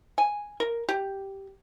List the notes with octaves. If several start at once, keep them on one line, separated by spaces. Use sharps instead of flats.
G#5
A#4
G4